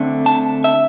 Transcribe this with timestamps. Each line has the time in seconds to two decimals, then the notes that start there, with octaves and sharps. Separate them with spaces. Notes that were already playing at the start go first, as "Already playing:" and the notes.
Already playing: D3 A3 C4
0.26 A5
0.64 E5